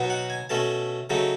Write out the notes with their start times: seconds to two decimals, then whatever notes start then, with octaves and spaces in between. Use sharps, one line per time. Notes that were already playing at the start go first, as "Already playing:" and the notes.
Already playing: B2 F#3 B3 D#4
0.10 F#5
0.30 G#5
0.49 B2 A3 C#4 A5
1.10 C#3 F#3 A3 D#4